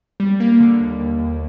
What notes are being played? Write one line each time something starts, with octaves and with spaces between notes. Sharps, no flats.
G3
A#3
D3
D#2
D#2
D#2